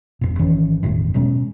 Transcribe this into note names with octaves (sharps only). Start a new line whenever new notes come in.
E1 F2 A#2
G#1 D#3 E3 C#4
G1 E2 A2 D#3
B2 F#3 G#3 C#4